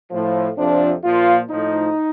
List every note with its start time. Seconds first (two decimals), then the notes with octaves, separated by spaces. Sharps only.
0.11 A2 F3
0.58 F2 C3 F3 D4
1.04 A#2 F3 F4
1.50 A2 F3 D#4